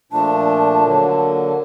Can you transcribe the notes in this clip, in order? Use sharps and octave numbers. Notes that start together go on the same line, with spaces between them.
A#2 F3 A3 D4 A5
D3 F#3 A#3